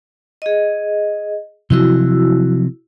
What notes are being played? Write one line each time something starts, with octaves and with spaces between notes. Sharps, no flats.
G#4 D#5
C3 F3 F#3 E4 F#4 E6